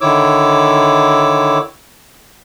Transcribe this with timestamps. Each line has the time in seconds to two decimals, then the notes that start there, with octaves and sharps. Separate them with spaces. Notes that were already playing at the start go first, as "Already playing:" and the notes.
0.01 D3 D#3 E4 C#5 D6 E6